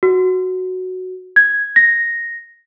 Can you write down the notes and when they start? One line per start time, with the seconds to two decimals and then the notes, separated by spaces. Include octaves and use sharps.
0.03 F#4
1.36 G#6
1.76 A#6